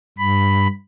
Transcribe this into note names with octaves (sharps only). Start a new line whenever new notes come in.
G2 B5